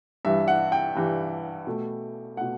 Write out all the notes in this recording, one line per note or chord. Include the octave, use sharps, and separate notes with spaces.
G2 E3 G3 E5
F#5
G5
G2 E3 G3
B2 A3
B2 A3 F#5